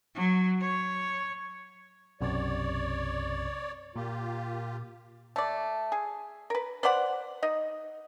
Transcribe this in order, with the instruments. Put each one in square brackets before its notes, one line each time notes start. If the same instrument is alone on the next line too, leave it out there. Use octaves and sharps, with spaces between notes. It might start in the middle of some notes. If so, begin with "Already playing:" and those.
[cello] F#3
C#5
[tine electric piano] B1 F#2 C3 [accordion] C#5 D5
[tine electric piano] A#2 [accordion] A#3 F4 G4
[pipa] A3 D5
G#4
A#4 B4
B4 C5 D5 F#5
D#4 D#5